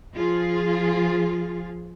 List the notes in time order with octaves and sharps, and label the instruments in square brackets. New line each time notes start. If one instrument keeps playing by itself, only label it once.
[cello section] F3 F4 G#4